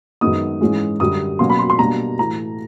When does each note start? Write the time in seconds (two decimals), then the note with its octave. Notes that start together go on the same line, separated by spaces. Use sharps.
0.21 F#2 D#3 G#3 B3 D#4 D#6
0.61 G#2 E3 G#3 C#4
1.00 F#2 D3 G3 D#6
1.39 B2 F#3 A#3 C#4 C6
1.50 B5
1.59 C6
1.70 C6
1.79 B2 G3 A#3 D4 A#5
2.18 A2 E3 A3 A#5